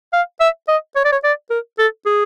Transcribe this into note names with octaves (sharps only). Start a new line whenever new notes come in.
F5
E5
D#5
C#5
D5
C#5
D5
A#4
A4
G#4